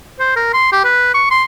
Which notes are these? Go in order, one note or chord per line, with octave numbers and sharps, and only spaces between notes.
C5
A#4
C6
G4
B4
C#6
C6